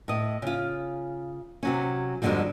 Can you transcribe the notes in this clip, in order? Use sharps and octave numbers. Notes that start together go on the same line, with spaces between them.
A2 D#5
C#3 F4
C3 F#3 C#4
F2 G#2 D3 D#3 F#3 G3